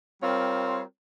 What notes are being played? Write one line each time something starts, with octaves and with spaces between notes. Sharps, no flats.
G3 C4 F4 A#4 C#5